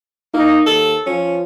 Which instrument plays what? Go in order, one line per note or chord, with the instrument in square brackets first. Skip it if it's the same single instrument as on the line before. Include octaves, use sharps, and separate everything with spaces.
[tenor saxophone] A#3 [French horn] D#4
[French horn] D#2 [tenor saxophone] A4
[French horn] F3 [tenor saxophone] C#4